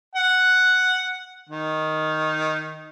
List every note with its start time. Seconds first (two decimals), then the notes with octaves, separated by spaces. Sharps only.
0.15 F#5
1.49 D#3